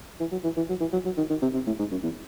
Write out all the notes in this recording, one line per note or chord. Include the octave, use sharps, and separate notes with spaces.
E3
F#3
E3
E3
F#3
E3
F#3
F#3
D#3
D#3
C3
C3
A2
G#2
F#2
E2